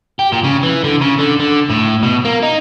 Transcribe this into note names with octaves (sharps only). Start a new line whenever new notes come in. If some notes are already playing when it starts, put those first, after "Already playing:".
G4
A#2
C#3
E3
D3
C#3
D3
D3
A2
B2
A#3
D#4